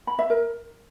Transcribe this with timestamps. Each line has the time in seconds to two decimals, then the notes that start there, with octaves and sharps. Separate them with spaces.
0.07 B5
0.19 E5
0.30 A#4